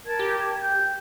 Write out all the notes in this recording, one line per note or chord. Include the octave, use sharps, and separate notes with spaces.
A#4 A5 G#6
G4
G6